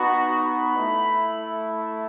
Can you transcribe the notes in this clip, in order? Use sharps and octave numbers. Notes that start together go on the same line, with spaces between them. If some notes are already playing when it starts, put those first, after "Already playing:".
Already playing: B3 D#4 F#4 B5
B5
A3 E4